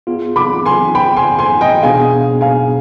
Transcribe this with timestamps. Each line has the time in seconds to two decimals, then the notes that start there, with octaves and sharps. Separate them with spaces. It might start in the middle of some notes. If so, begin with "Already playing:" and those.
0.07 B3 F4 G#4
0.36 B5 D6
0.66 G#5 C6
0.95 G5 B5
1.17 G#5 C6
1.39 G#5 C6
1.61 D#5 G5
1.82 B2 B3 D4 G#4 F5 G#5
2.41 F5 G#5